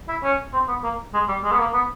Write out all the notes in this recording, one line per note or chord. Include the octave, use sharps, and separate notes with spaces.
E4
C#4
C4
B3
A#3
G#3
G3
G#3
B3
A#3
B3